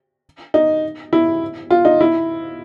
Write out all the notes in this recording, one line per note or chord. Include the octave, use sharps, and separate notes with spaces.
D#4
E4
F4
D#4
E4